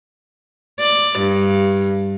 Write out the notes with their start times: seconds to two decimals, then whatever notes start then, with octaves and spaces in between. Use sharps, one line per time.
0.80 D5
1.19 G2